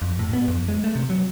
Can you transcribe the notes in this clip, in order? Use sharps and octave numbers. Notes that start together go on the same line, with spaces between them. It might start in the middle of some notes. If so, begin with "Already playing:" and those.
F2
A2
B3
F2
G#3
A3
C3
F#3